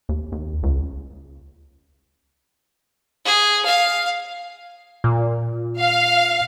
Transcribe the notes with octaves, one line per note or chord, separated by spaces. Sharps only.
D#2
D#2
C#2
G#4
F5
A#2
F5